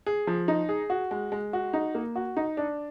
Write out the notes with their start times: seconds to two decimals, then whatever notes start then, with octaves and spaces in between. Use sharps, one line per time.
0.06 G#4
0.27 F3
0.48 D#4
0.69 G#4
0.90 F#4
1.11 G#3
1.32 G#3
1.53 F#4
1.73 D#4
1.95 A#3
2.16 F#4
2.37 D#4
2.57 D4